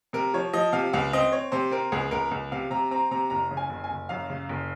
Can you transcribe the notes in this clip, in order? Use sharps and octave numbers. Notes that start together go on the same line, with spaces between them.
C3 A#4
F3 C#5
F3 D#5
C3 F5
C#2 F5
C4 D#5
C4 C#5
C3 C5
C4 A#4
C#2 G#4
C#2 A#4
C#2
C3 F5
C3 A#5
C4 A#5
C3 A#5
F#1 A#5
C#3
G#5
F#1
G#5
F#1
F#2 F5
C#3
F#1